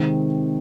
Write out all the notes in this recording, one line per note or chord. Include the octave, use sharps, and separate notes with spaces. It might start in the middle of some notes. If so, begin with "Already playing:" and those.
Already playing: C3 D#3 G#3 C4